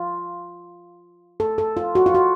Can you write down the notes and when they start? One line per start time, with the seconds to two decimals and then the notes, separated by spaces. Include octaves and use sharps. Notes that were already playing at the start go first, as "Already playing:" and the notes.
Already playing: F4
1.40 A4
1.58 A4
1.77 F4
1.95 F#4
2.06 F4
2.15 F#4